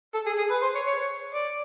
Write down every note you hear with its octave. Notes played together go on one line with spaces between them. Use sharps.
A4
G#4
G#4
B4
C5
C#5
C#5
D5